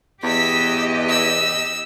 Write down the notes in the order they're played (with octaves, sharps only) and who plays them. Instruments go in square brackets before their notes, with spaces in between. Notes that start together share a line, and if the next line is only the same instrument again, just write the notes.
[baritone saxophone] E2 [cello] G4 D#5 [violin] E6 B6
[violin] E6